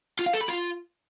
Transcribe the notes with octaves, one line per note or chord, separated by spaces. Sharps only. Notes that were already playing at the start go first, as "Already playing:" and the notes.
F4
F5
A4
B5
F4